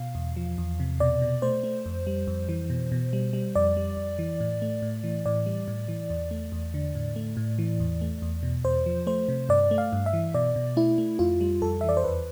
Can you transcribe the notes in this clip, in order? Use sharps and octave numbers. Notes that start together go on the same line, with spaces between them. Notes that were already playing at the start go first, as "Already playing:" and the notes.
Already playing: B2 F5
E2
F3
E2
C3
B2 D5
B2
A3 C5
A3
F2
G3
F2
E3
B2
B2
G3
G3
F2 D5
G3
F2
E3
A2
A3
A2
E3
A2 D5
G3
A2
E3
E2
A3
E2
D3
A2
A3
A2
E3
E2
A3
E2
B2
E2 C5
F3
A3 C5
C3
G2 D5
A3
F5
G2
E5
E3
B2 D5
B2
A3 E4
A3
F2 F4
G3
F2 A4
E3 E5
D5
C5
E2 B4